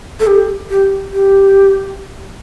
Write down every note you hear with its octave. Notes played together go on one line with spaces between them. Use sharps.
A4
G4
G4
G4